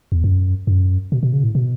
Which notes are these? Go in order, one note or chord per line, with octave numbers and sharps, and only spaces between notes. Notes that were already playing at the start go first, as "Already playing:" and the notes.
E2
F#2
F#2
B2
B2
C#3
A2
B2